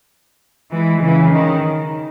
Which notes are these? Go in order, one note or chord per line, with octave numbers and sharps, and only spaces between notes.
E3 G#3
C#3 E3
D#3